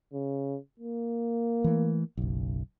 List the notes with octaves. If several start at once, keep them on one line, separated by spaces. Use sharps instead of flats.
C#3
A#3
E3 A3
F#1 B1